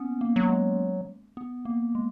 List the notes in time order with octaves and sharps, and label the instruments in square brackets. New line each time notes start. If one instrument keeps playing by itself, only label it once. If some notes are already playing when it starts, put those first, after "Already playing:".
Already playing: [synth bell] A#3 B3 C#4
A#3
[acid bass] F#3
[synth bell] G#3
B3
A#3
G#3